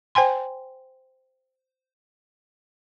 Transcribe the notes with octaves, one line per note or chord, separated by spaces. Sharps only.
C5 G5 G#5 C6